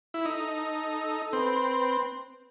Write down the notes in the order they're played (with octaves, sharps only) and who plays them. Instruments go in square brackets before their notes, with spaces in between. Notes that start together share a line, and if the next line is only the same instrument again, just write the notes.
[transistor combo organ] E4
[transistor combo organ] D#4 [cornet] A4
[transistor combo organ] C4 [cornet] B4
[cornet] B4